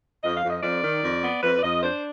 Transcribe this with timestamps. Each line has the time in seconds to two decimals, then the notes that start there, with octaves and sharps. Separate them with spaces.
0.24 F2 D#5
0.37 F5
0.43 F2
0.50 D#5
0.63 F2 D5
0.83 D#3
1.03 F2
1.23 B3
1.43 F2 B4
1.58 D5
1.63 F2 D#5
1.83 D4 C5